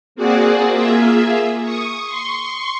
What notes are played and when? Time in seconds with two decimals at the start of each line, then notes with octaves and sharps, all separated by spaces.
0.15 A#3 C4 F#4 G#4 D5 F#5
0.71 A#3 F4 G#4 E5
1.62 C#6 D#6
2.06 C6 C#6